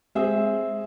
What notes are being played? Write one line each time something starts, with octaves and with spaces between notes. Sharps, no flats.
G#3 C4 G#4 E5